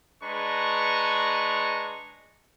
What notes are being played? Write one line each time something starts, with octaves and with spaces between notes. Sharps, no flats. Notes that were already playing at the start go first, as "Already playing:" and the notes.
G#3 D4 B4 A#5 C#6